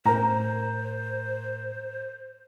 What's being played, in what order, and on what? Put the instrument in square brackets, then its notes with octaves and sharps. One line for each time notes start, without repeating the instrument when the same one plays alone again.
[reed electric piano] A2 A#4 [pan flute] C5 [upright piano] A#5